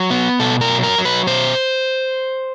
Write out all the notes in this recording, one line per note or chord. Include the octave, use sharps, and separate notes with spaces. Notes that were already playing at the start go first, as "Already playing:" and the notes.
Already playing: F#3
B3
B2 A4
A#4
F#3
A#4
F#3
B4
B2 C5